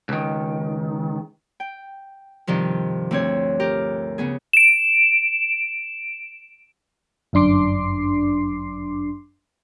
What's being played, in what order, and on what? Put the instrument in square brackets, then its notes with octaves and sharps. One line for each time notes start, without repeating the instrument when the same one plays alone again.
[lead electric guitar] C#2 D#3
[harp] G5
G2 C3 D#3 F3
D2 C4 C#5
G4 A#4
C#3 B3 G#4
[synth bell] D7 E7
[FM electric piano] G1 F#2 D4 C6 D6 C7